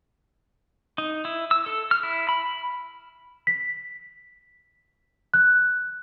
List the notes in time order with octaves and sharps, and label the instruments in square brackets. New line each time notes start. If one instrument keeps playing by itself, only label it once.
[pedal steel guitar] D#4
E4
E6
A4
F6
E4
B5
[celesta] B6
F#6